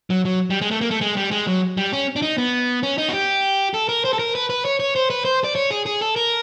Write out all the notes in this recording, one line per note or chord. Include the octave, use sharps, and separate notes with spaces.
F#3
F#3
G3
G#3
A3
A#3
A3
G#3
G3
G#3
F#3
G3
C#4
D4
D#4
B3
C#4
D#4
F#4
G4
A4
A#4
C5
A4
A#4
B4
B4
C#5
C#5
C5
B4
C5
D5
C#5
G#4
G#4
A4
A#4